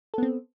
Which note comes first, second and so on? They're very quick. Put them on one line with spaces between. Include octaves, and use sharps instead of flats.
A4 B3 C4